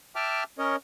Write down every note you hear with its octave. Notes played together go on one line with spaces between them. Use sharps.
E5 G5 A5 D6 F6
C#4 A#4 C#5 D#5